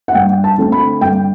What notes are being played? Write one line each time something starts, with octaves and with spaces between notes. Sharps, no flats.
F#5
G2 G5
A5
D3 A3 C4
B5
G2 G5